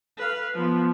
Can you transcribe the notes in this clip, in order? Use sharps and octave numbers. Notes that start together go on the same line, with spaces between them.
B4 F5
F3 B3